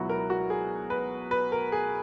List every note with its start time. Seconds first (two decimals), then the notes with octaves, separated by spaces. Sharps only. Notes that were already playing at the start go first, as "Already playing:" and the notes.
Already playing: C#2 B2 F#3 E4 F#4
0.09 A#4
0.30 F#4
0.50 G#4
0.90 B4
1.31 B4
1.52 A#4
1.72 G#4